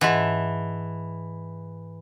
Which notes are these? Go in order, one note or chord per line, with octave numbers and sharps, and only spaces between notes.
G#2 E3 D#5 F#5 A5